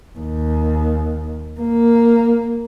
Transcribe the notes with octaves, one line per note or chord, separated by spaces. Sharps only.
D#2
A#3